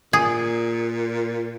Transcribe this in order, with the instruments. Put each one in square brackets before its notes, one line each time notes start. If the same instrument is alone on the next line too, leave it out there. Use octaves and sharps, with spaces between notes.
[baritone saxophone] A#2 [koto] G#4